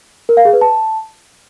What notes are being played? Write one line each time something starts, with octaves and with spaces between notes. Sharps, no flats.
A#4
F5
G#4
B4
A5